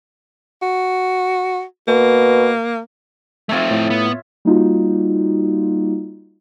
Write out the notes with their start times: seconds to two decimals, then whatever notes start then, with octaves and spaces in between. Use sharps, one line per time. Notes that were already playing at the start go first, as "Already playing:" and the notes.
0.62 F#4
1.88 B2 A#3
3.49 A3 C4 F4 C#5 E5
3.71 A2
3.90 B3
4.45 G3 A#3 D#4 F4 F#4